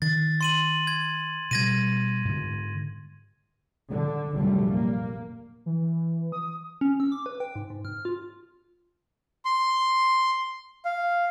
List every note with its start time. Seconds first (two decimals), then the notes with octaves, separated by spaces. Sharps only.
0.02 D#3 A6
0.41 C6 D#7 F#7
0.87 G#6
1.51 B2 G3 G#6 A#6 D#7
2.25 G#2 D3
3.89 D3
4.33 F1 A#1 F#2 D3 G3 A3
4.71 A#3
5.66 E3
6.32 D#6
6.81 C#4
7.00 E6
7.12 D6
7.26 B4
7.40 G5
7.56 G#2
7.70 G#2
7.85 F6
8.05 F4
9.45 C6
10.85 F5